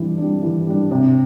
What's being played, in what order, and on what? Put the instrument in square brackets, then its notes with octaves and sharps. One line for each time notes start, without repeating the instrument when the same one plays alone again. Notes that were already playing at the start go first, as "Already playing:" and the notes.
Already playing: [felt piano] E3 G3 D4
G3 D4
E3
G3 D4
C3